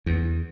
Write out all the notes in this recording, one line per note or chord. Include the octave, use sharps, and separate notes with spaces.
E2